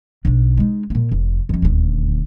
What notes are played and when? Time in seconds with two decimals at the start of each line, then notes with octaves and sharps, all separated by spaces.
0.25 B1 D4
0.57 G#3 D#4
0.90 A#2 A#3
1.12 F1
1.49 F2 C#4
1.62 D#1 D2